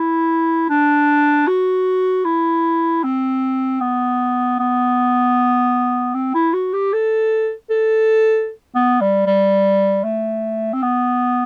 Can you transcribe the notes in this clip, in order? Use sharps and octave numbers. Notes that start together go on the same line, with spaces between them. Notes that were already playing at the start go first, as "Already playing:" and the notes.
Already playing: E4
D4
F#4
E4
C4
B3
B3
C4
E4
F#4
G4
A4
A4
B3
G3
G3
A3
C4
B3